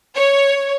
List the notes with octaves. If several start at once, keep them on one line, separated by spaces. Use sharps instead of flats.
C#5